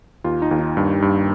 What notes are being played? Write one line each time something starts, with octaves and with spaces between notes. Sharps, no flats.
D#2 F4
D#4
D#2
D#4
G2
G2